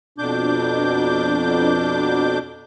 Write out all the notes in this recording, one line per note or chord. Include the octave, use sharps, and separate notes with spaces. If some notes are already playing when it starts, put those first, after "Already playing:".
F2 B2 D4 D6 G6